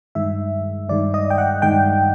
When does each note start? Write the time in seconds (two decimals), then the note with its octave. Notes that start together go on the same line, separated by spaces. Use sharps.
0.15 G2 D#3 G#3 E5
0.89 G2 D#3 G#3 D5
1.14 D#5
1.30 G5
1.38 F#5
1.62 G2 D#3 G#3 G5